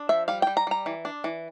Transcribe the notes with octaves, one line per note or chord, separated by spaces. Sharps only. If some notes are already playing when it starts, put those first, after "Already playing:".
Already playing: D4
F3 E5
G3 F5
G3 G5
A#5
G3 A#5
E3
D4
E3